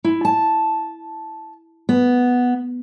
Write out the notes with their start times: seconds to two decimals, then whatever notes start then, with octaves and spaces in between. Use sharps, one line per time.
0.04 E4
0.25 A5
1.89 B3